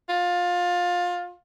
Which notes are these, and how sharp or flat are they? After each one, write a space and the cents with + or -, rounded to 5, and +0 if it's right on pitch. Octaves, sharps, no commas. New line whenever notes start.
F4 +20